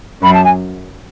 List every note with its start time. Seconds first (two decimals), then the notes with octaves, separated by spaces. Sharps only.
0.22 F#2 B5
0.34 A5
0.45 G#5